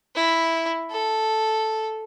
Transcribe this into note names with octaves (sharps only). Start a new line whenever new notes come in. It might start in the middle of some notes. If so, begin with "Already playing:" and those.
E4
A4